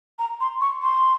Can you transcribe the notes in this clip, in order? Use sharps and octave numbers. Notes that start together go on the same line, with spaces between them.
A#5
C6
C#6
C6